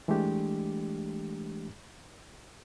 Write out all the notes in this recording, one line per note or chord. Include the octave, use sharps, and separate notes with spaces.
E3 G#3 A3 D4 G4